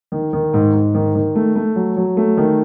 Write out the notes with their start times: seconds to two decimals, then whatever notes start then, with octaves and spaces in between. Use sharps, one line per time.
0.12 D#3
0.33 D#3
0.54 G#2
0.74 G#2
0.94 D#3
1.15 D#3
1.35 A3
1.56 A3
1.76 F#3
1.97 F#3
2.17 A3
2.37 D#3